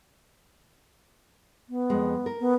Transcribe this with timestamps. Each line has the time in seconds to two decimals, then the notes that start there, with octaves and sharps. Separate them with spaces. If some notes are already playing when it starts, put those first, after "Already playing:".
1.69 B3
1.90 F2 G#3
2.26 A#4
2.40 B3